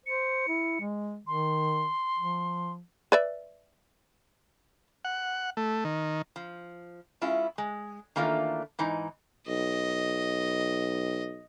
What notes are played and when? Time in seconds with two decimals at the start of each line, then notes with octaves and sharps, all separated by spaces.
0.06 C5 C#7
0.48 E4
0.80 G#3
1.27 D#3 C6
2.17 F3
3.12 B4 D5 E5
5.05 F#5
5.57 A3
5.84 D#3
6.36 F3
7.22 G#3 C#4 E4 F4
7.58 G#3
8.16 D#3 E3 A3 A#3 D4 F4
8.79 G#2 E3 D#4
9.48 B1 D#5